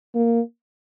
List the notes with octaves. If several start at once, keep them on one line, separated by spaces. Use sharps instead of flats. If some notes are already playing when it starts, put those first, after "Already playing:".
A#3